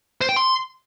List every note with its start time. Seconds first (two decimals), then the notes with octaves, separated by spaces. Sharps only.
0.21 C5
0.29 G5
0.36 C6